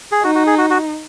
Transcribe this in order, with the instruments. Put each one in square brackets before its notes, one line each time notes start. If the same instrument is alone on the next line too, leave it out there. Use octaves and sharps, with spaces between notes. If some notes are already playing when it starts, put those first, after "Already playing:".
[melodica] G#4
[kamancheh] D#4 [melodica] F#4
[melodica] F#4
G#4
F#4
F#4